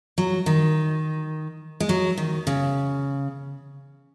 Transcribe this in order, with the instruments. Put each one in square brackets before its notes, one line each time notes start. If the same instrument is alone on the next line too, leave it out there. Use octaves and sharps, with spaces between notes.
[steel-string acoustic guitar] F#3
D#3
G#3
F#3
D#3
C#3